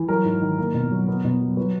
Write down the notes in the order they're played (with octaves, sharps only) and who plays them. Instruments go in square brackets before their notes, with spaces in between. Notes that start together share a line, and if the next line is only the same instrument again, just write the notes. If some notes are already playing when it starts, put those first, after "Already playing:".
Already playing: [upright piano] E3
F#3 A#4
G#2
D#3
A#3
B2
F#3
B3
B2
F#3
F#3 B4